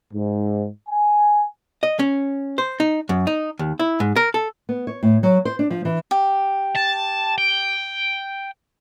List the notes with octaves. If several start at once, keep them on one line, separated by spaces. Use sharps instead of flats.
G#2
G#5
D#5
C#4
C5
D#4
F#2
D#4
D#2
E4
G#2
A#4
A4
B3
C#5
A2
F#3
C5
D4
F3
E3
G4
A5
G5